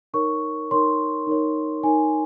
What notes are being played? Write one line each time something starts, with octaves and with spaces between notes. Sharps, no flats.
D#4 A#4 C#5 C#6
D#4 A#4 C#5 C6
D#4 A#4 C#5
D#4 A#4 C#5 G#5